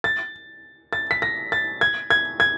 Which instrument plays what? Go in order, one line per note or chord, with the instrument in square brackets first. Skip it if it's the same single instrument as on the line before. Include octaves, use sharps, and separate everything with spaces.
[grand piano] A6
A6
B6
A#6
A6
G#6
G#6
G#6